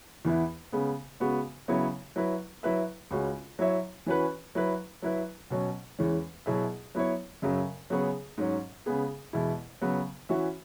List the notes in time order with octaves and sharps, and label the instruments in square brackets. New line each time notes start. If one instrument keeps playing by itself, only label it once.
[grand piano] E2 E3 B3 E4
C#3 G#3 B3
C#3 G#3 B3 F#4
C#3 F#3 B3 E4 C#5
F#3 E4 B4
F#3 E4 B4 E5
C#2 C#3 G#3 C#4 F#4
F#3 E4 C#5 E5
E3 C#4 F#4 B4
F#3 E4 B4
F#3 E4 B4
B2 F#3 C#4
E2 E3 G#3 C#4
B2 F#3 E4 G#4 E5
F#3 B3 E4 C#5
F#2 C#3 F#3
C#3 F#3 B3 G#4 C#5
G#2 F#3 C#4
C#3 G#3 B3 G#4
E2 B2 G#3 E4
C#3 F#3 B3
E3 C#4 F#4 E5